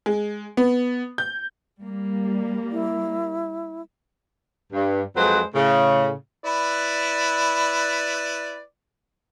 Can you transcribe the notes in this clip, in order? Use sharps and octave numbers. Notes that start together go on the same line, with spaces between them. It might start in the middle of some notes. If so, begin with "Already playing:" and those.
G#3
B3
G6
G3 A#3
E4
G2
F2 F#3 G#3 B4 C5
A2 C#3
E4 B4 D5